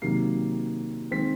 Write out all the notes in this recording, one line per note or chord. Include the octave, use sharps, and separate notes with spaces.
C3 D#3 F#3 A#3 C7
D#3 G#3 C4 B6